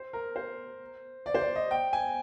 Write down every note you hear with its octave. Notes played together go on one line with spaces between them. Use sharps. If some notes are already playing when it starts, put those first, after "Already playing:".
Already playing: C5
A#4
C5
D5
C5
D5
D#5
G5
G#5